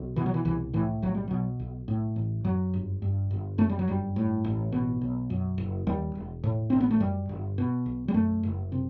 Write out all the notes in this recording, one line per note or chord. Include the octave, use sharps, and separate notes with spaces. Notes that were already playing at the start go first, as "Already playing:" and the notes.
Already playing: B1
B2 E3
F#3
E3
C2 E3
A2 E3
B1 F#3
G3
B2 F#3
B1
A2
A1
F#2 F#3
G1
G2
G1
F#2 A3
G3
F#3
G1 G3
A2
A1
B2
B1
F#2
F#1
D#2 G3
E1
A2
A1 C4
B3
A3
F#2 G3
G1
B2
B1
G3
F#2 A3
F#1
C3